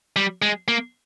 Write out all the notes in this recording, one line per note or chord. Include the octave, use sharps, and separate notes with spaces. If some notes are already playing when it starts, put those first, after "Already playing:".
G3
G#3
A#3